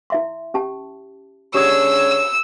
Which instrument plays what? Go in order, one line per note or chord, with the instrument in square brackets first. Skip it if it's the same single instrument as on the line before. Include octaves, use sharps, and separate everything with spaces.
[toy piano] E4 E5 C6
C#4 G4 A5
[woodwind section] D3 G#4 [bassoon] C#4 [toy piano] G4 D#6 [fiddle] E6